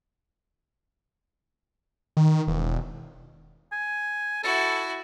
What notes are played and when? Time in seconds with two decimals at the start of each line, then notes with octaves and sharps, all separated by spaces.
2.17 D#3
2.47 E1
3.72 G#5
4.43 E4 F#4 A4